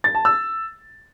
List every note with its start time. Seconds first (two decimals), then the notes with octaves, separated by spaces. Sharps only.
0.04 A6
0.15 A5
0.25 E6